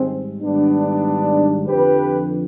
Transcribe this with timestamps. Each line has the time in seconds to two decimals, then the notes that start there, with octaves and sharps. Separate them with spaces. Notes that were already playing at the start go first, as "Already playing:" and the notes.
Already playing: G#2 D#3 G3 G#3 C4
0.43 G#2 D#3 G3 B3 D4
1.68 F2 D3 F3 G4 B4